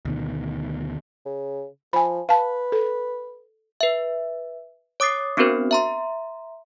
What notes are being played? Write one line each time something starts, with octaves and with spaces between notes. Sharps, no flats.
D2 B2 D#3
C#3
F3 G#5 B5
B4 F5 A5
A4
B4 E5
C#5 D6 D#6 A6 C7
B3 C4 D4 F#4 A#4 C5
E5 A#5 C6